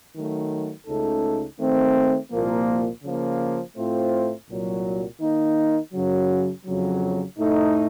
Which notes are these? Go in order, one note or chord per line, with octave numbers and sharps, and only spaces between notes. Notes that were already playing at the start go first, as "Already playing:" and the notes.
D#3 F#3 A3
C#2 C#3 A3 D#4 A4
D#3 A3 C4
C2 A#2 F3 A#3
C#3 F3 A#3
A2 A3 C4 F4 C5
C2 A#2 F#3
D#3 A#3 D#4
F#2 C#3 F#3
F2 C#3 F#3
A2 A3 D#4